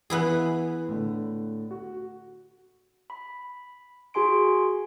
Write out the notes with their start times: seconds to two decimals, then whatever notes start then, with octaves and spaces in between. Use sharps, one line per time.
0.10 E3 B3 E4 G#4 B4 F#6
0.88 A2 D3
1.71 F#4
3.10 B5
4.14 F#4 G#4 G#5 C6 D7